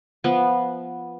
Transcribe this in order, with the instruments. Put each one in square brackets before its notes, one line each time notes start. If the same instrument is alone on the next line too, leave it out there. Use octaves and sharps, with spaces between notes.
[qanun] F3 B3